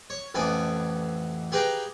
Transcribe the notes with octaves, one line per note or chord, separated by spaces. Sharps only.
C#5
A1 F2 B3 G#5 D6
G4 G#4 B4 F5 G5 A#5